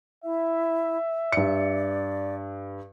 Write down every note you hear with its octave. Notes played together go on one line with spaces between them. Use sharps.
E4 E5
G2 D5 C#7